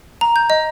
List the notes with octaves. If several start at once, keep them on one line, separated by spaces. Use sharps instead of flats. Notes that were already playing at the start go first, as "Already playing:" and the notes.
A#5
G6
D#5